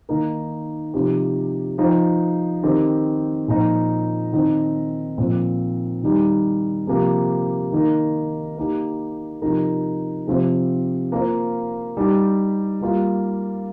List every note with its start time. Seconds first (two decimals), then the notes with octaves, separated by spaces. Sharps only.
0.09 D#3 A#3 D#4 A#4
0.93 C3 F3 D#4 G4 C5
1.78 F3 D#4 C5
2.63 D#3 C4 G4 A#4
3.48 A#2 F3 D#4 C5
4.33 D#3 C4 D#4
5.18 A#2 F3 C4 F4
6.03 D#3 G3 D#4
6.87 C3 F3 A#3 G4
7.72 D#3 A#3 D#4 A#4
8.57 A#3 D#4 G4
9.42 C3 F3 D#4 G4 A#4
10.27 C3 F3 C4 G4 C5
11.12 A#3 F4 C5
11.97 G3 D#4 G4
12.81 G3 A#3 F4